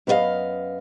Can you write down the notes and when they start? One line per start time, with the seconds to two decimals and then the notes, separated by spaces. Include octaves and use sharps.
0.07 F#2 B3 D#4 F4 D#5 F5